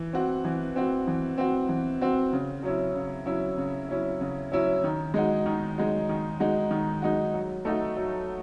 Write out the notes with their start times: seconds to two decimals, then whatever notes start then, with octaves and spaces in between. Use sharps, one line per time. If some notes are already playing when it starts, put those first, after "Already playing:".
Already playing: E3
0.13 C4 F#4
0.45 E3
0.76 C4 F#4
1.07 E3
1.38 C4 F#4
1.69 E3
2.01 C4 F#4
2.33 C#3
2.63 F#3 C#4 E4
2.95 C#3
3.26 F#3 C#4 E4
3.58 C#3
3.89 F#3 C#4 E4
4.21 C#3
4.52 F#3 C#4 E4
4.84 D#3
5.14 G#3 D#4 F#4
5.46 D#3
5.78 G#3 D#4 F#4
6.09 D#3
6.40 G#3 D#4 F#4
6.71 D#3
7.02 G#3 D#4 F#4
7.34 F#3
7.65 A3 D#4 F#4
7.97 F#3